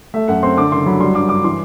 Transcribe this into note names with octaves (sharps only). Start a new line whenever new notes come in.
A3 E5
F#2 F#5
C4 C6
D3 D6
F#1 C6
F#3 B5
G3 C6
G2 D6
G2 D6
E3 C6